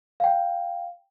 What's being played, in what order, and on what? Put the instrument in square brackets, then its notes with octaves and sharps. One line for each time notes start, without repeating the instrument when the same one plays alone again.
[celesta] F5 G5